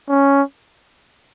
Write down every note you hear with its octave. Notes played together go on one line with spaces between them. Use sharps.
C#4